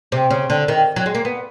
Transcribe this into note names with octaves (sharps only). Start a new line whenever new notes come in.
C3
C#3
D3
D#3
F#3
G#3
A#3
B3